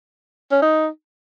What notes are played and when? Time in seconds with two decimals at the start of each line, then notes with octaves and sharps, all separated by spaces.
0.52 C#4
0.62 D#4